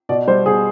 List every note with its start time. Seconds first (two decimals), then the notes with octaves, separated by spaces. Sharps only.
0.09 B2 D5
0.27 G3 C5
0.46 B2 G#4